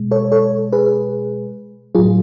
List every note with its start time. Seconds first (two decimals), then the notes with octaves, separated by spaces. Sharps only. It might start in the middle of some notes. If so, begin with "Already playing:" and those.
Already playing: B2 G#3
0.11 A4 C#5
0.32 A4 C#5
0.72 G#4 B4
1.95 F#3 F4 G#4
1.99 A2